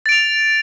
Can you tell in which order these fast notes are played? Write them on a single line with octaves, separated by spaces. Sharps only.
A6 D7 F7